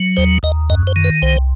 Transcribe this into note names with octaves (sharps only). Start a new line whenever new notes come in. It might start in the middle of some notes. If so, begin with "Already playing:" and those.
Already playing: F#3
D#2 C5
D#2 D#5
F#2 D#5
C5
D#3
B4
C2 C5